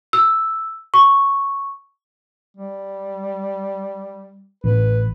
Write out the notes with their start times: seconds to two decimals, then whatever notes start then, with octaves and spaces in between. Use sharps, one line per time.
0.13 E6
0.94 C#6
2.57 G3
4.64 A1 B4